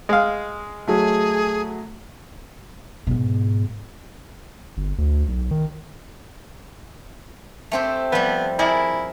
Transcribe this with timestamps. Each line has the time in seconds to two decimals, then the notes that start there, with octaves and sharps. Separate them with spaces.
0.09 G#3 F5
0.87 F#3 A3 G#4
3.07 G#2 B2
4.77 G1
4.98 D2
5.28 B1
5.51 D#3
7.72 A3 C4 G4
8.12 F3 G3 B3
8.59 E4 G#4 A#4 D5